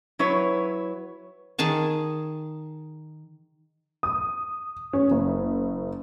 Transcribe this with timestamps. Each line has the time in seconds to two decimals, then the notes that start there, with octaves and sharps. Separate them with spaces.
0.19 F#3 E4 B4 C#5
1.58 D#3 G#4 A5 C#6
4.03 D#6
4.93 C#4
5.11 F#1